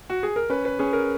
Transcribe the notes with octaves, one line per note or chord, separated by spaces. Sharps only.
F#4
G#4
A#4
C#4 B4
B4
C#4 G#4
A#4